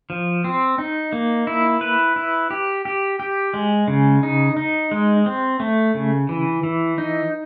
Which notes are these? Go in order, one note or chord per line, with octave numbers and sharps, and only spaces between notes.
F3
C4
D#4
A#3
E4
B4
E4
G4
G4
G4
G#3
C#3
D#4
D#4
G#3
C4
A3
C#3
E3
E3
D#4